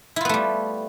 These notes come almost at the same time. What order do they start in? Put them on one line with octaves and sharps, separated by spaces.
E4 F4 B3 A3 G3